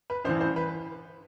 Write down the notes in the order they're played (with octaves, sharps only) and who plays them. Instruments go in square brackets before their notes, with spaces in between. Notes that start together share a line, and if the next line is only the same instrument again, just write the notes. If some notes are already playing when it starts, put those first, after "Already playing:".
[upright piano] B4
A1 G2 E3 C5
C5
B4